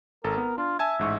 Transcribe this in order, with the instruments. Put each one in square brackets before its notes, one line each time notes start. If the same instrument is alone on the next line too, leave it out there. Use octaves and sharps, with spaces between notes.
[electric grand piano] G#1 A4 [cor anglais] A#4
[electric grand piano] B3
[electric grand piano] D4 [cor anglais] F4
[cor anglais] E5 [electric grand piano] G#5 A5 G#6
[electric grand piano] A1 G#2 C#6